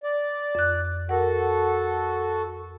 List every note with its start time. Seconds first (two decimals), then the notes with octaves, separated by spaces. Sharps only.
0.03 D5
0.55 F2 F#6
1.09 F#4 A4 A#4 F#5